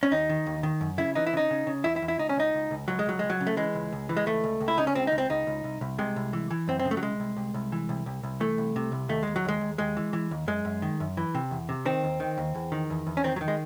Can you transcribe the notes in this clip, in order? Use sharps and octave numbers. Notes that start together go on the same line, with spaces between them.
C#4
D#2 D#4
D#3
D#2
D#3
F#2
C#3 E4
E3 D#4
E4
C#3 D#4
C#3
C#3
E2 E4
E4
E2
E4
C#2 D#4
C#4
C#2 D#4
C#2
C#2
C#2 F#3
G#3
C#2 F#3
C#2 G#3
F#3
C#3
A3
E3 G#3
C#2
C#2
E3
G#3
C#2 A3
C#2
C#2
E4
C#3 D#4
C#4
C#2 C4
D#4
C#2
C4
C#2 D#4
C#2
C2
C2
C3 G#3
C2
E3
E3
F#2 C4
C4
C#3
A3
F#3
C2 G#3
C2
C2
C2
E3
C2
C2
C2
E3 A3
C2
C3
C2
D#2 A3
D#2 G#3
F#3
D#2 G#3
D#2
D#2 G#3
E3
E3
D#2
F#2 G#3
F#2
D#3
F#2
E3
C3
E2
C3
D#3 C4
D#2
D#3
D#2
E2
D#3
E2
E2
C#4
D#3 C4
F#3
D#3
G#3